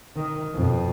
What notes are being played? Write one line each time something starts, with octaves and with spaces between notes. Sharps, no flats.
D#3
F2 B2